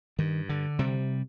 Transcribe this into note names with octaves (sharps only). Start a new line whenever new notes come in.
G2 D#3
D3
C3 G3